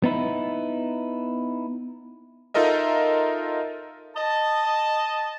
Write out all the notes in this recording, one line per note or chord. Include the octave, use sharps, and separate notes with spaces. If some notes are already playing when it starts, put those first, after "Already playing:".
B3 D#4 E4
D#4 F4 A4 A#4 D#5 E5
D#5 A5